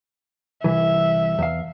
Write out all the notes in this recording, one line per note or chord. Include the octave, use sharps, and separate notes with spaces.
C2 E3 E5
E2 F5